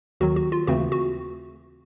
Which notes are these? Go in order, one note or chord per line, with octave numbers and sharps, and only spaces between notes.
D#2 D#3 F#3 F#4
F#4
F4
D#2 C#3 E3 A3 C4 F#4
F#4